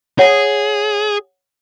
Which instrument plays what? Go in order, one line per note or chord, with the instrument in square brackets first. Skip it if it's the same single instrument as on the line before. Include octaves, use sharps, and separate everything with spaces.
[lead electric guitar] G#4 [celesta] C#5 F#5